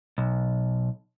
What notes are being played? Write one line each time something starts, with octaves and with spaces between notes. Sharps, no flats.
B1